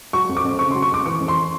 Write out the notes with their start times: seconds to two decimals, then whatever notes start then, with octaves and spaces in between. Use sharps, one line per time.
0.13 F#3 C#6
0.29 F2
0.37 D6
0.44 F2
0.59 C#3 C#6
0.71 F#3 C6
0.82 C#6
0.91 F2 D6
1.05 E3 C#6
1.20 F2
1.28 C6